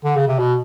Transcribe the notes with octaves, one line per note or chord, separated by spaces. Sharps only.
D3
C#3
C3
B2